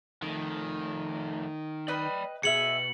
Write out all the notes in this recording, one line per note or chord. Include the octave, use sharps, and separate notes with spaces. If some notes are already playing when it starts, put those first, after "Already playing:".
F2 D#3 A3
B4 D5 D#5 G5 B5
B2 G#4 E5 C#7 F#7